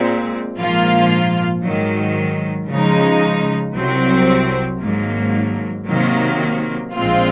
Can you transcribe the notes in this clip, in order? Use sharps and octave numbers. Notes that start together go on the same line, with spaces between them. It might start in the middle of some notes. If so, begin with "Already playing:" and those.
Already playing: A#2 G#3 C4
A#1 G#2 F3 A#3 F4
G#2 D#3 F#3
C#3 F3 G#3 D#4
C2 C3 F#3 C4
G#1 G#2 F#3 A#3
C3 D#3 F#3 A#3
A#1 A#2 G#3 C4 F4